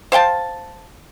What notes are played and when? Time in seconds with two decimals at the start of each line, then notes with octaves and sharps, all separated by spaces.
0.12 C5 F5 G5 A5